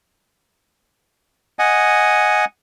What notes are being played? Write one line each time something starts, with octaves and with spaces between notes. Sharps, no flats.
D#5 F#5 G#5